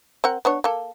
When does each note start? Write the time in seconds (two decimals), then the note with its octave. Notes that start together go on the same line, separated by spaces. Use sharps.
0.24 C4 A#4 F#5
0.45 B3 D4 C#5
0.64 A#3 A4